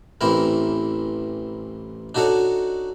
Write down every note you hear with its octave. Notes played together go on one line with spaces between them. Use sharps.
A1 E3 C4 E4 A#4
D4 D#4 F#4 A4 C#5